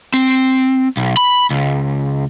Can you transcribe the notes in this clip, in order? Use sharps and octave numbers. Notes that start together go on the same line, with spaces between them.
C4
B1
B5
C#2